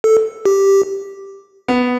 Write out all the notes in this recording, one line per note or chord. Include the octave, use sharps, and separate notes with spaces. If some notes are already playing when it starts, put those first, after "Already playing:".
A4
G4
B3